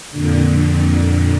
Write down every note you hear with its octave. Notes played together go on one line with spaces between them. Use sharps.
F2 A#2 D3